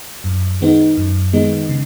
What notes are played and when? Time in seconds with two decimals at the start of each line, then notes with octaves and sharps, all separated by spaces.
0.24 F#2
0.61 D#3 G#3 B3 D#4
0.97 F#2
1.33 D#3 G#3 B3 D#4
1.69 C#3